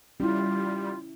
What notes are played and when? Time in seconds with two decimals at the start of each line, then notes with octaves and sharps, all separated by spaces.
0.20 G3 C#4 E4 F4